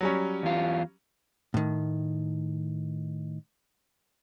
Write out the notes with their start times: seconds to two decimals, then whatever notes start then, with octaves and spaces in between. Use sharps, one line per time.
0.01 F#3 G3 C#4
0.43 E2 F4
1.54 A2 D#3